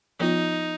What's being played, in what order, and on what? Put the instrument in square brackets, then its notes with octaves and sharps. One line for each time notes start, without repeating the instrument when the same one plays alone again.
[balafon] F3 B3 F4 [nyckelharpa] D#4